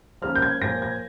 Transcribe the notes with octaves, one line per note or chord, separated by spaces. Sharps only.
F3 A#3 C#4 F6
G6
G#6
A#2 F3 A#3 A#6
G#6